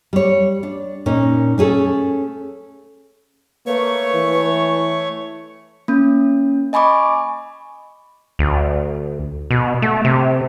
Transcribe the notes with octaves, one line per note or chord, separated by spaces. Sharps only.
G3 C#5
D4
A#2 C#4 D#4
A3 C#4 G#4 A4
A3 A#3 B4 C#5 C#6
E3
A#3 C#4
D#5 G#5 B5 C#6 D6
D2
B2
A3
C3